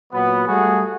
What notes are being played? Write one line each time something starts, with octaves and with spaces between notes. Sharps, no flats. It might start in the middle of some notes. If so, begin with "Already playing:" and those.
A#2 F#3 B3
G3 A3 F#4 G#4